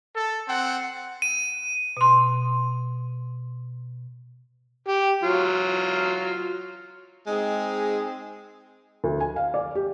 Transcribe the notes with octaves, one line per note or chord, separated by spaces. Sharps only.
A4
C4 F#5
D#7
B2 C6
G4
F#3 F4
G#3 C4 D#4 G#4
D2
G#5
F5
D5
G4